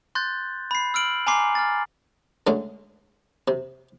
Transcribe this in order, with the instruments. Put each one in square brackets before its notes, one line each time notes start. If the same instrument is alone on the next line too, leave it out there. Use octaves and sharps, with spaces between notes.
[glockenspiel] C6 F#6 G6 A6
B5 C7
E6 F6 D7 F#7
G#5 A#5 C6 D6 C7
F6 A6
[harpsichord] D3 G#3 A3 C#4
C3